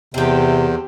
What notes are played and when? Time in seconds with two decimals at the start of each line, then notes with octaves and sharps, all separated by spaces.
0.14 E2 C3 C4 G4